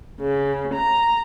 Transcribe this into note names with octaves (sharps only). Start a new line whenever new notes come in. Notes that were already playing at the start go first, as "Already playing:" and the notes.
C#3
A#5